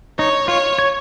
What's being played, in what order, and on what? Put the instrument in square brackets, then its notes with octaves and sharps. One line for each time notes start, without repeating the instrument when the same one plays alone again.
[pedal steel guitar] D#4 [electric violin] C#5
[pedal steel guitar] F4 [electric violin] C#5
[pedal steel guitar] C#5